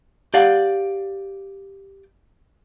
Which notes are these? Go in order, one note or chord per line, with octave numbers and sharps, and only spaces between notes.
G4 D5 F5 F#5